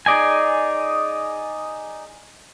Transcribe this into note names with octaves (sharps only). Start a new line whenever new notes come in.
D#4 G#4 D5 D#5 G#5